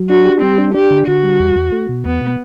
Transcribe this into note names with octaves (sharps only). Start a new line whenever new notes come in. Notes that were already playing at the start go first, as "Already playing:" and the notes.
Already playing: F#3
D4 F#4
G4
G3 C4
D4
D4 G4
D3
D3 F#4
G3
E2
E2
A3
B2
E2 B3
B2